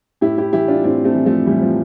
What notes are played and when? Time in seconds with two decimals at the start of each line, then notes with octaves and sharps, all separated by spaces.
0.21 A2 E4 G4
0.38 E4 G4
0.53 E3 E4 G4
0.68 D4 F4
0.84 A2 C4 E4
1.04 A3 C4
1.15 E3
1.25 F3 A3
1.46 A2 E3 G3
1.62 F3